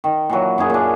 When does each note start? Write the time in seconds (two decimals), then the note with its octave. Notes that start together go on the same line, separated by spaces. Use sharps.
0.04 D#3
0.29 A#2 E3 F#3
0.58 F#2 E4 G#4
0.70 A#2 D4